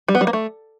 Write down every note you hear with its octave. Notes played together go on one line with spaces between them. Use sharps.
G3
B3
G3
A#3
A3